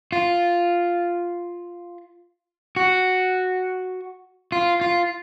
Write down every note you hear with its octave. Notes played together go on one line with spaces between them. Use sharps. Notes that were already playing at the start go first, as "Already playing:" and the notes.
F4
F#4
F4
F4